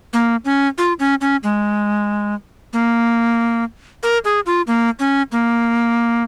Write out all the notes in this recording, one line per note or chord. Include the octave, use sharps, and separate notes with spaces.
A#3
C#4
F4
C#4
C#4
G#3
A#3
A#4
G#4
F4
A#3
C#4
A#3